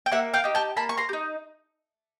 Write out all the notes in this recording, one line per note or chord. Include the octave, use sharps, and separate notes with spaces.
G5
A#3 E5 F#5
F5 G5
D#4 G4
G5 A5
A#3 A5 B5
C#6
A#5 C6
G4
D#4